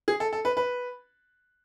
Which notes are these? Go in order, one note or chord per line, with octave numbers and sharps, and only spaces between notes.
G#4
A4
A4
B4
B4